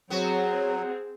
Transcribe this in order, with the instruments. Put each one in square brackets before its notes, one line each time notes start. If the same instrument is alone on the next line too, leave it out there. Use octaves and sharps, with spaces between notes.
[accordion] F#3 [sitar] B3 F#4 [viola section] C4 G#4